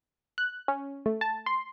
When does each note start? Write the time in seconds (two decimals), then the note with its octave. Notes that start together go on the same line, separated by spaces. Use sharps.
0.38 F#6
0.68 C#4
1.06 A3
1.21 A5
1.46 C6